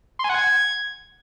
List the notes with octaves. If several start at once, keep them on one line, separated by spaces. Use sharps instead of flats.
C6
G#5
F#5
G#6